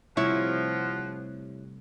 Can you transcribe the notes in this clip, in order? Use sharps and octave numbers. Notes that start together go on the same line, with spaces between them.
C3 F3 G3 A3 E4 C#5 F#5